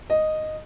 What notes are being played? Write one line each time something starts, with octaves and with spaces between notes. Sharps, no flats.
D#5